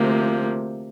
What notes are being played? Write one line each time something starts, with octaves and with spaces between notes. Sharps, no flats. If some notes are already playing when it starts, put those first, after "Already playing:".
Already playing: D2 C3 F3 A#3